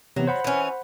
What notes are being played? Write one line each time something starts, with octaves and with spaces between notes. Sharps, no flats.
C3 E3 F#3 B3
C5 F#5 B5
E3 C#4